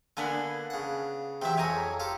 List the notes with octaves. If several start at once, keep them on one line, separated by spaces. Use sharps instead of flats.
D3 A#3 B3 D4 G#5
C#3 F#5
C3 E3 F#3 E5 G5
F2 G#4 C#5 G#5 A#5
F4 G4 A4